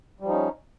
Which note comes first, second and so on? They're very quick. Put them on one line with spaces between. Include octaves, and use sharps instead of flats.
G3 F3 D#4 C#4